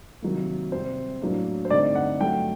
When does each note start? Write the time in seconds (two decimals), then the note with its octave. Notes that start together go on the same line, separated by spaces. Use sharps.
0.22 C3 D#3 F#3 A#3
0.72 C3 G3 C4 C5
1.22 A2 F#3 A#3 D4
1.65 C5
1.70 G2 D3 A3 C4 D#4 D5
1.95 F#5
2.20 G2 F#3 A3 G5